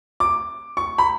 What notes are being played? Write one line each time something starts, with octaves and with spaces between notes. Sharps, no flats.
D6
C#6
B5